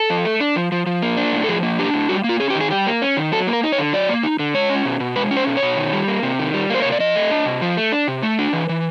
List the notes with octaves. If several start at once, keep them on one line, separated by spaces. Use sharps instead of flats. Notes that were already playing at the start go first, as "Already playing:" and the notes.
Already playing: A4
F3
A3
D4
F3
F3
F3
A#3
D4
A2
A4
F3 G#4
A#3
D4 G4
A2
G3 F#4
A#3
F4
C#4 G#4
G4
D#3
G#4
G3 G4
A#3
C#4
D#3
F#3 A4
A#3
A#4
D#4
C#5
D3
F#3 D5
A#3
D#4
D3
G#3 C#5
C#4
B2
B2
G#3 B4
C#4
C5
B2
C#5
B2
D#3
G3
A#3
C3
D#3
G3
A#3 C5
C3 C#5
D5
F3 D#5
A3
D4
C3
F3
A3
D4
C3
A3
D4
E3
E3